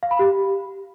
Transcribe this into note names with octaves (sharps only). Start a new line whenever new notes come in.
F5
B5
G4